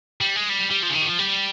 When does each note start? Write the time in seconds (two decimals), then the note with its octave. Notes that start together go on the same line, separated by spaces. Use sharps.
0.21 G3
0.36 G#3
0.49 G3
0.71 G3
0.82 F3
0.90 C#3
0.94 D#3
1.02 G3
1.07 F3
1.19 G3